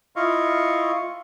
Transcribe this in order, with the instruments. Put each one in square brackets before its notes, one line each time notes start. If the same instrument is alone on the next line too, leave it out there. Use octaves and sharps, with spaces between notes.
[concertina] E4 F4 D#5 F5 C#6